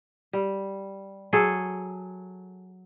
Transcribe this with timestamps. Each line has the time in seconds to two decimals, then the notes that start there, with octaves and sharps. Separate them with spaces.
0.33 G3
1.33 F#3 G#4 A4